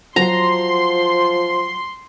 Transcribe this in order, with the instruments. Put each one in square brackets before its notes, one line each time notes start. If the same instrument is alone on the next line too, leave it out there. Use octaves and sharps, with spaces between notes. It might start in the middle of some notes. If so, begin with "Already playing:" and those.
[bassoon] F3 [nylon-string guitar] F#3 F#4 [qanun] A#5 [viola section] C6